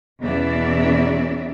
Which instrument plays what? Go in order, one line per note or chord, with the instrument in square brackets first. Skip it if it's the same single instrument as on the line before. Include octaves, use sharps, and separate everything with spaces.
[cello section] E2 B2 E3 C#4 D5 E5